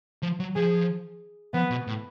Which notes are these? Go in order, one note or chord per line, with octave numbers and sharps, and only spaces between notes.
F3
F#3
F3 G#4
F3 B3
B2
A2